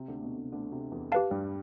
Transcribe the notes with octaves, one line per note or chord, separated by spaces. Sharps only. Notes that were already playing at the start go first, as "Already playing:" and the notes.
Already playing: C3
D2 D3
B2
C3
D2 D3
C3
E2 E3
G4 B4 F5 A5
G2 G3